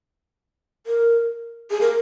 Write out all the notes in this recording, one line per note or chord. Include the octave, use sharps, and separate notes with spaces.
A#4
G#4
A#4